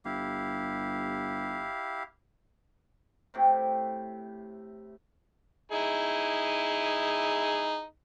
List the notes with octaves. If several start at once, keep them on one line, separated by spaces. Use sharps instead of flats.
G1 E4 G4 F5
A2 C3 G4
D#4 E4 G#4